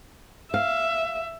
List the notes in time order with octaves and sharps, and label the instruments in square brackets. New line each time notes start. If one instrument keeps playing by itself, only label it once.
[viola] E5 [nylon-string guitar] F5